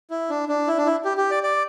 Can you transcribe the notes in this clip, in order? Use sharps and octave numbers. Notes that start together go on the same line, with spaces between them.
E4
D4
D4
E4
D4
E4
G4
G4
D5
D5